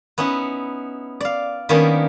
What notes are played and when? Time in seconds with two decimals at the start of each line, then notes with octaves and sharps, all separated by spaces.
0.18 B3 C#4 D#4 E4
1.20 D5 F5
1.69 D#3 G3 A#3 B3 C#4 D4